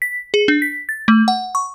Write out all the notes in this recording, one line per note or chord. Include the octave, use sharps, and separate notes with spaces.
B6
G#4
D4
B6
A6
A3
F#5
C#6